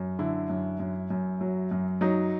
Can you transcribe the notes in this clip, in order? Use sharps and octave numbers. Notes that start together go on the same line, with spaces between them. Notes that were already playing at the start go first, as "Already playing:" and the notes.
Already playing: F#2
D3 E4
F#2
F#2
F#2
F#3
F#2
F#3 D#4